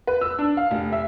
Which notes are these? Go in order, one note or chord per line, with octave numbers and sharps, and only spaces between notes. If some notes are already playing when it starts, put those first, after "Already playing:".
B4
E6
D4
F5
F1
E5